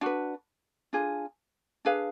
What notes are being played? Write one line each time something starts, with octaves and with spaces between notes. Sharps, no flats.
D4 F#4 B4
D4 F4 G#4
D4 G#4 B4 F5